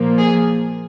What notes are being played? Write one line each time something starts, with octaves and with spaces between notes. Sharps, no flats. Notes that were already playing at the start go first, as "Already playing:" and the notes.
Already playing: A#2 F3 A#3
G#4